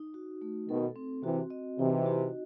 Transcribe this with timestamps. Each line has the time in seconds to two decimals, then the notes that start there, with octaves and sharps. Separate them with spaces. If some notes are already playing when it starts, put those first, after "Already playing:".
Already playing: D#4
0.14 F#4
0.42 A3
0.68 B2 D#3 A4
0.96 C4
1.23 C3 E3 F#4
1.50 D#5
1.78 C3 E3 D#4
2.06 F#4